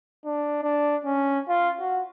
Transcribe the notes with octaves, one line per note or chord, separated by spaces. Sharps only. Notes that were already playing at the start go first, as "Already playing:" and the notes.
D4
D4
C#4
F4
F#4